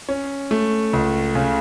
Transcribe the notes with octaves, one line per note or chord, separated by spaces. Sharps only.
C#4
A3
C#2
C#3